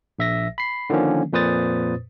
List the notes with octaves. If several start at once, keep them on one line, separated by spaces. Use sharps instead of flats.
A#1 E5 A#6
B5 C7
D3 D#3 F3 A#3 C#4
F2 A#2 B4 C5 D#6 A6